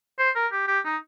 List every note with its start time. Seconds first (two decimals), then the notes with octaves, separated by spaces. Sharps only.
0.19 C5
0.35 A#4
0.52 G4
0.68 G4
0.85 D#4